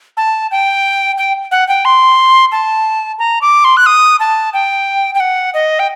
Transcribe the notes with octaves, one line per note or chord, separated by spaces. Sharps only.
A5
G5
G5
F#5
G5
C6
A5
A#5
D6
C6
F#6
D#6
A5
G5
G5
F#5
D#5
G5